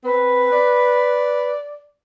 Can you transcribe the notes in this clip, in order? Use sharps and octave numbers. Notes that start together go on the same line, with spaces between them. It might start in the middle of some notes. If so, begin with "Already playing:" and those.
C4 B4
D5